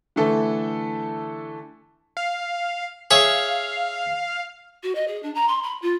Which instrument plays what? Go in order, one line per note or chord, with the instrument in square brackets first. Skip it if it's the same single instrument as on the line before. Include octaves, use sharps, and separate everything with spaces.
[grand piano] D3 E3 A3 A4
[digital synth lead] F5
[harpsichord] G#4 C#5 E5 [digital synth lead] F5
[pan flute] F#4
D#5
G#4
D4
A#5
C6
B5
F4